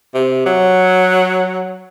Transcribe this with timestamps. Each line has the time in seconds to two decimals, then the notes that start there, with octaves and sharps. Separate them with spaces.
0.14 C3
0.46 F#3